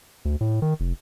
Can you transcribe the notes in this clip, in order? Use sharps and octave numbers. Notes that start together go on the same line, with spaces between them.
D2
A2
D#3
F1